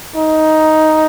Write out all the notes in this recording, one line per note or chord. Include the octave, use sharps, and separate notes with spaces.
D#4